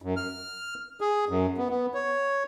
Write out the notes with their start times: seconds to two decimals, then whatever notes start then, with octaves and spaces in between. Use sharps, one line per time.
0.02 F#2
0.17 F6
1.01 G#4
1.29 F#2
1.57 B3
1.70 B3
1.94 C#5